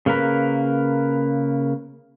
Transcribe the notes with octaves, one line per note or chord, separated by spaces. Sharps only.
C#3 A#3 A#4 B4 A#5